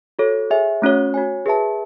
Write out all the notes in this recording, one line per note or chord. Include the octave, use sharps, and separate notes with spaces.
F#4 A4 C#5
G#4 C#5 E5 G#5
A3 C#4 F#4 C#5
F#4 C#5 G#5
G#4 B4 E5 A5